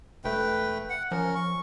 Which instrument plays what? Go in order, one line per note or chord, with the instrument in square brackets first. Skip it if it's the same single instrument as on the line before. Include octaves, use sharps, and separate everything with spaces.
[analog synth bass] E1 [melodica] A3 B4 G5
[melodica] F#5
[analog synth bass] F3 [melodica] C#4 A#4
[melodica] C#6